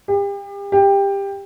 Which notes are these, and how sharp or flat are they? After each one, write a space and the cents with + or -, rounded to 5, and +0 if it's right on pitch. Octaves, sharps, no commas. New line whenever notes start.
G4 +35
G4 +15